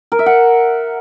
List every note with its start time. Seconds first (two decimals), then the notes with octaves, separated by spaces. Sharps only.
0.12 A#4
0.19 E5
0.26 F#5